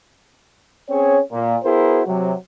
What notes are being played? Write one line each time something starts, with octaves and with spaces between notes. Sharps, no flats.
C4 C#4 G#4 C#5
A#2
B3 E4 F#4 G#4 A#4 C5
C3 F#3